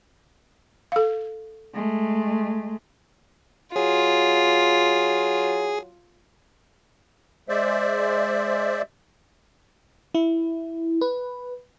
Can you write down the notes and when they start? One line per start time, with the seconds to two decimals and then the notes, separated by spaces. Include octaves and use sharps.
0.92 A4 F5
1.74 G#3 A3
3.76 F#3 F4 G#4
7.49 G#3 C5 D5 E5
10.14 E4
11.01 B4